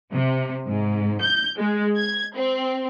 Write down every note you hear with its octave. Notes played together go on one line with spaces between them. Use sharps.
C3
G#2
G6
G#3
G#6
C4